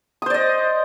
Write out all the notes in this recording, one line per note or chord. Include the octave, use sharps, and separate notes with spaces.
C5 D5 D#5 D#6